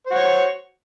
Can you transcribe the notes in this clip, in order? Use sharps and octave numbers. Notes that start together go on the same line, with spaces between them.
F#4 C5 C#5